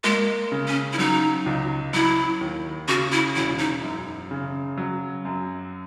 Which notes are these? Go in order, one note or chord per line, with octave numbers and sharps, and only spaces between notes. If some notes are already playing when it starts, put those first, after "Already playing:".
G#3 A#3
C#3
C#4
E4
F#3 D#4
C#2
F#3 E4
D#2
C#3 F#4
E4
E1 E4
D#4
F#2
C#3
F#3
F#2